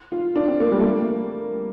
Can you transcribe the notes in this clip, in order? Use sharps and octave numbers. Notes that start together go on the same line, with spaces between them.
F4
D4
C4
A#3
G3
A3
A#3